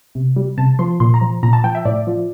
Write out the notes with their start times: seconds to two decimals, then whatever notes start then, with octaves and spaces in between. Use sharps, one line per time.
0.15 C3
0.36 G3
0.58 C3 A5
0.79 F3 C6
1.00 A#2 C6
1.14 A#5
1.21 F3
1.43 A#2 A#5
1.53 A5
1.64 F3 G5
1.75 E5
1.85 A2 D5
2.07 F3